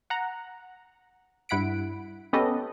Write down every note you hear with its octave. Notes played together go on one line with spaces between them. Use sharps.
F#5 A#5
G2 E4 F#5 B6 D7
B3 C#4 G4 A4 B4 D#5